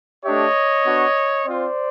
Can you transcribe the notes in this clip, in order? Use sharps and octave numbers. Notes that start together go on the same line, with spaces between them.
A3 D4 G4 C#5 D#5
B3 D4 F#4
C4 F4 C5 D5